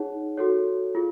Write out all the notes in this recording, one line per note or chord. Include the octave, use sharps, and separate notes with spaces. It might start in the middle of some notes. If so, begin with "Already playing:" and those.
Already playing: D#4 G#4 C#5 F#5
F#4 A4 C#5
F4 G#4